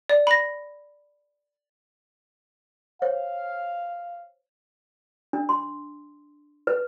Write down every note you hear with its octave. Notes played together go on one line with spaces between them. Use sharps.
D5
B5 A#6
C5 C#5 F5
D4
C6
B4